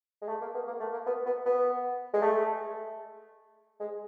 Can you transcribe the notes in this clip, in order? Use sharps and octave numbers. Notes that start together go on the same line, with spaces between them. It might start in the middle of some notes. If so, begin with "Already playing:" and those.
G#3
A3
A#3
B3
A#3
A3
A#3
B3
B3
B3
G#3
A3
G#3